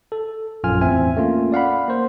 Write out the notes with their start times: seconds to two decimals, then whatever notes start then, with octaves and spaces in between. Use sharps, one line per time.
0.12 A4
0.64 A#1 F#2 F4 G#5 F6
0.81 E2 A2 C4 E5 G#5
1.16 A3 A#3 C#4 F4
1.52 D5 F5 F#5 B5
1.88 A#3 C5